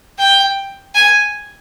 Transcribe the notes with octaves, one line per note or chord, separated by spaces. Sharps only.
G5
G#5